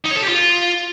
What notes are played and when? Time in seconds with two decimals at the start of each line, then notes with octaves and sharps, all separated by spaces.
0.04 D#4
0.10 C#5
0.16 A4
0.22 G4
0.28 F4